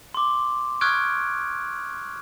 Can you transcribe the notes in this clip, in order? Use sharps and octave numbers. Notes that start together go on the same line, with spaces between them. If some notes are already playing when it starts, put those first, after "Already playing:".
C6 D6
C#6 D#6 F6 F#6 G#6 D7